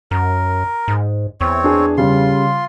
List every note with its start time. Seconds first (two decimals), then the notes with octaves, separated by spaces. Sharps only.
0.11 F#2 A#4
0.88 G#2
1.41 E2 C4 C#5
1.64 D4 G#4
1.97 C#3 G3 F4 C6